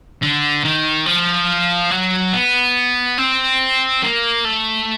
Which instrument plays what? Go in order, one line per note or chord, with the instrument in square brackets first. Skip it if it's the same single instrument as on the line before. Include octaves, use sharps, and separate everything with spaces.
[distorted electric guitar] D3
D#3
F3
F#3
B3
C4
A#3
A3